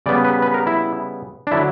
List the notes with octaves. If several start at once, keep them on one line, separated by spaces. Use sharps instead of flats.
C#3 G3 B3 D5
B4
B4
A#4
E4
D4
D3 F#3 E4